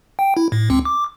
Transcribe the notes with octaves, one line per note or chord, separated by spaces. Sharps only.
G5
E4
A2
C#2 C4
D6